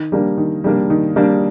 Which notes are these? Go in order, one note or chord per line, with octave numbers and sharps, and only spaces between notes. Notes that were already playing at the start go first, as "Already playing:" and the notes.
Already playing: D#3
G3 A#3 D4
D#3
G3 A#3 D4
D#3
G3 A#3 D4